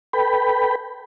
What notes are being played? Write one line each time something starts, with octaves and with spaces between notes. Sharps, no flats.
A4 B4 G5 B5